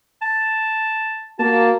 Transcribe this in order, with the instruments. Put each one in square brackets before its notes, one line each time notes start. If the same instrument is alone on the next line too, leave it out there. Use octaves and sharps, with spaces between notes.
[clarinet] A5
[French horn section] A#3 F#4 [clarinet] A5